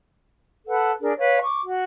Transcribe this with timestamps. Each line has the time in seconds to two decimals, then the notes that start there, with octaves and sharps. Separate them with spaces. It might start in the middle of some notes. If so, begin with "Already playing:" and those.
0.66 A4 B4 F#5
1.02 D4 G#4 A#4
1.19 B4 C#5 F5
1.43 C#6 D6
1.65 F#4